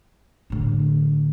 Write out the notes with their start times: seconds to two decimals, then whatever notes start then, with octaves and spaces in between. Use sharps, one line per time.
0.50 A2 D3